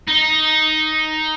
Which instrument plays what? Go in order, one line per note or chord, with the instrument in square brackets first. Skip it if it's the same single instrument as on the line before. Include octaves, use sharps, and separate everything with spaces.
[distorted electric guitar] D#4